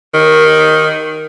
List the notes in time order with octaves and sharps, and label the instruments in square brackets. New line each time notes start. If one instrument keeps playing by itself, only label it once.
[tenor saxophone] D#3